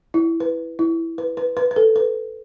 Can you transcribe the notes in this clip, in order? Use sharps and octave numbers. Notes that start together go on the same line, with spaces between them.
E4
B4
E4
B4
B4
B4
B4
A4
B4